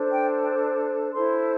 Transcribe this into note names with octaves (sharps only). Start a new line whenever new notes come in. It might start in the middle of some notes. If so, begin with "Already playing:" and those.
Already playing: D4 A4 C5
G5
E4 A4 C5 C6